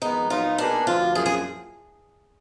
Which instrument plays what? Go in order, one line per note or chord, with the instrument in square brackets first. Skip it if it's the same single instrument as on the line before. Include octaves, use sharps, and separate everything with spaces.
[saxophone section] F2 D#3 G#3 B3 [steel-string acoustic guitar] D#4
[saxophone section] A#2 F#3 B3 D#4 [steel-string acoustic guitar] F4
[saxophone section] B2 A#3 D#4 G#4 B4 [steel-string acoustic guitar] D4
[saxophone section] D2 D3 F3 [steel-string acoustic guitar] F4
[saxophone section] F#2 F3 A#3 F4 [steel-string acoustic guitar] G#4
[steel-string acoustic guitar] G#4